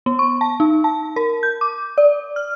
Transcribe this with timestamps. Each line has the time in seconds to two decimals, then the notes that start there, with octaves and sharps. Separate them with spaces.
0.06 B3
0.19 C#6
0.41 A5
0.60 D#4
0.84 A5
1.16 A#4
1.43 G6
1.61 D6
1.98 D5
2.36 F6